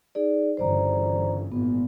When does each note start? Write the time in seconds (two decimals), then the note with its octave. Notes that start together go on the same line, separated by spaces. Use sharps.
0.15 D#4 G#4 D5
0.57 G1 C#3 E3 C5 D5 A#5
1.52 G#1 A#2 B3